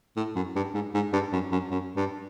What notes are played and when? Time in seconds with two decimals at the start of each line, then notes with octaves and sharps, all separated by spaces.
0.17 A2
0.36 F#2
0.56 G2
0.74 G#2
0.94 G#2
1.13 G2
1.32 F#2
1.52 F#2
1.71 F#2
1.96 G2